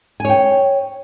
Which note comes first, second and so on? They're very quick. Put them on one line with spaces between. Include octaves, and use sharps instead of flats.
G#5 C#5 G5